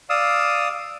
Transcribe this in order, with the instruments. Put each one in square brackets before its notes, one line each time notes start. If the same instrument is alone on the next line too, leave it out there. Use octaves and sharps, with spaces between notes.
[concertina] D5 F5 D#6 E6